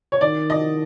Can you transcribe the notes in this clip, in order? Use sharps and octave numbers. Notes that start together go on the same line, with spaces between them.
C#5
D#3 D5
D#5